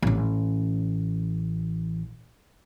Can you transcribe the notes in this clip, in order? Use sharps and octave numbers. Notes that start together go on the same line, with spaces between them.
A1 C#4